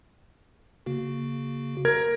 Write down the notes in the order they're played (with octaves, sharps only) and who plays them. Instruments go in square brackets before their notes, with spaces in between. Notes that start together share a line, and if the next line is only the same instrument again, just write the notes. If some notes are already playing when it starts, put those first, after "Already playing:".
[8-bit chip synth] C#3 A#3 F#4
[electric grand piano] A#4 G#6